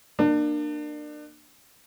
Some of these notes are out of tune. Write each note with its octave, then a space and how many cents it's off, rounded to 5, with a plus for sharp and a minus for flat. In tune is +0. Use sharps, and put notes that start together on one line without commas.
A#3 +0 D4 +30